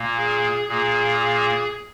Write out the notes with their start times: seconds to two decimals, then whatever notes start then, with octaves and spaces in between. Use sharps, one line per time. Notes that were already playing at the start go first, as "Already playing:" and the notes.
Already playing: A#2 A#3
0.17 G#4
0.68 A#2 A#3 G#4
1.21 G#4